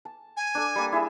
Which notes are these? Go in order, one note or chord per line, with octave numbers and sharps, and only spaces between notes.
A5
G#5
D4 A4
G3 A#3
E4 G#4 E5